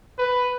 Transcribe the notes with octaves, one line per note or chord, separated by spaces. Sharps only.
B4